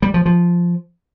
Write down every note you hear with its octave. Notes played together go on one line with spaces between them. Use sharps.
G3
F3
F3